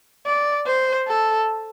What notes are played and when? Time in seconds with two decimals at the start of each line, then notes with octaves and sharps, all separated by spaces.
0.26 D5
0.66 C5
1.07 A4